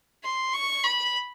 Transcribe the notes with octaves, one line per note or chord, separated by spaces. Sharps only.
C6
C#6
B5